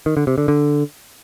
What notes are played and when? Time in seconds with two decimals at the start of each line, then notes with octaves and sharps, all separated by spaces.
0.06 D#3
0.17 D3
0.27 C3
0.38 D3
0.48 D3